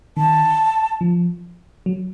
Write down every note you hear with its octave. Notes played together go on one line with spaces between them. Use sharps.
D#3 A5
F3
F#3